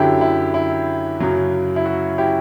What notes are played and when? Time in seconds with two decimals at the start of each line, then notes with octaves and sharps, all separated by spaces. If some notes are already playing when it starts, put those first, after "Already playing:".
Already playing: F#2 D3 F#3 E4 G4
0.21 E4
0.54 E4
1.20 F#2 C#3 F#3
1.76 E4
1.86 F#4
2.18 E4 G4